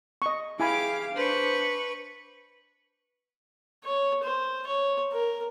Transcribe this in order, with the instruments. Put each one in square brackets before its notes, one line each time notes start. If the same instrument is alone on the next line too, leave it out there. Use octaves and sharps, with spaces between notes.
[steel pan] D#5 C#6
[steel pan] E4 G#5 B5 [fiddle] G4 D6 [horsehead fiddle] G#4 F5
[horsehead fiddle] D4 [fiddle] B4 C#6 [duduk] C5
[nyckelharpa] C#5
C5
C#5
A#4